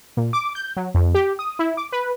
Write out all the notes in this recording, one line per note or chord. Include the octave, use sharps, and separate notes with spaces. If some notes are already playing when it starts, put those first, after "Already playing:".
A#2
D6
G6
F#3
F2
G4
D#6
E4
D6
B4